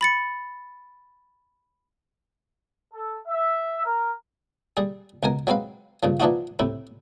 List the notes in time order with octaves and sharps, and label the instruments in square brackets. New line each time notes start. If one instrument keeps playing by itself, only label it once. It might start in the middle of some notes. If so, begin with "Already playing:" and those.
[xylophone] B5 A6 C#7
[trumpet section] A4
E5
A#4
[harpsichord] G3 G#4
C#2 B2 A#4 G#5
F#3 G#3 C4 B4 F5
G2 C#3 F3
E3 F3 D4 D#4 F4 F#4
A2 C3 E4